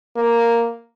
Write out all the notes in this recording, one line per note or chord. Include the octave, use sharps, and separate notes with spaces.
A#3